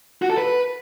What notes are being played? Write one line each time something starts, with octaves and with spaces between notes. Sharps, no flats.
F#4
A4
B4